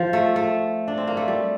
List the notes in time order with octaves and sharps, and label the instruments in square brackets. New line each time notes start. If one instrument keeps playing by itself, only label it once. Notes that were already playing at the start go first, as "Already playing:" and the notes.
Already playing: [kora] F3
A3
A3
D4
C4
A#3
A3
G3